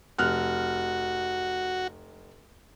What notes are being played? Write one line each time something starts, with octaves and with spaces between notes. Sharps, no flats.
F1 F#4 F6 F#6